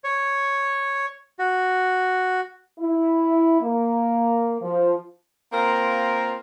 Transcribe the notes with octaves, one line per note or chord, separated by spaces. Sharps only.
C#5
F#4
E4
A#3
F3
A#3 C4 F4 A#4